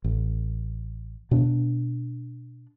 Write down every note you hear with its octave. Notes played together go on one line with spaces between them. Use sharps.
A1
B2 D4